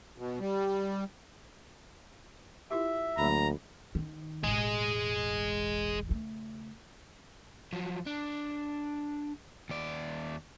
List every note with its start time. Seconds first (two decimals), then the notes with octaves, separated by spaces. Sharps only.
0.18 B2
0.40 G3
2.71 E4 F4 G4 E5
3.18 D2 F#3 A#3 A#5 B5
3.95 D#3
4.43 E1 A1 G#3 G#4
6.09 C#3 A3
7.73 F3 F#3
8.06 D4
9.69 D#2 D5